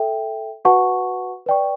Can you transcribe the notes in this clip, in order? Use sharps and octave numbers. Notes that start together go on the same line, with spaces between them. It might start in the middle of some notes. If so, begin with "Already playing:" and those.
Already playing: A4 E5 G5
F#4 B4 F#5 A5 C#6
B4 D5 G5 C#6